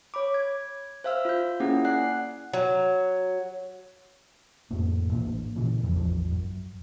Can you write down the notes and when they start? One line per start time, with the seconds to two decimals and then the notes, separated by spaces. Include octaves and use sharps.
0.14 C#5 B5 D6
0.34 G#6
1.04 C5 E5 F5 E6 F6
1.25 F4 G6
1.60 A#3 C#4 E4 G#4 F#5
1.84 D5 F#5 G#5 F#6 C7
2.53 F#3
4.71 F2 A2 A3 A#3
5.10 A1 A2 A#3 D4
5.56 A#2 C#3 E3
5.83 D#1 F2
5.96 A1 E2 F3
6.31 F#2